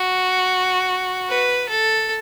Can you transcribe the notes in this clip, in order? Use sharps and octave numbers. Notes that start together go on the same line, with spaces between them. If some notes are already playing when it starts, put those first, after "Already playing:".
Already playing: F#4
B4
A4